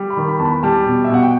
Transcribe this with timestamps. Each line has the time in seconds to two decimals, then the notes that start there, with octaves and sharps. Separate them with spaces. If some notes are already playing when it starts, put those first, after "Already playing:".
Already playing: G3
0.10 B5
0.17 D#3
0.28 B5
0.39 E2 A5
0.45 B5
0.63 G3 A5
0.86 B2
1.04 E5
1.10 B2 F#5
1.23 G5